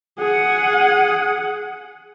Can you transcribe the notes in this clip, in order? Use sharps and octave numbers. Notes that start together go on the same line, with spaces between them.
G#4 F#5